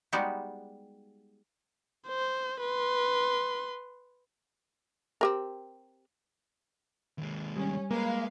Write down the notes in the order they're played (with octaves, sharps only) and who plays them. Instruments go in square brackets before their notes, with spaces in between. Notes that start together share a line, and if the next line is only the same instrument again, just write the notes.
[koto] G3 G#3 B3 D#4 F#4 G4
[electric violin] C5
B4 C6
[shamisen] C4 G4 A#4
[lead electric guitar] D#2 G#3
[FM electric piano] G3 [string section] C#4
[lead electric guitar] G#3 [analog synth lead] A#3 [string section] B4 F5